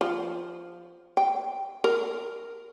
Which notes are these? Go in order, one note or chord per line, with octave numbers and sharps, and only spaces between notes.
F3
G5
A#4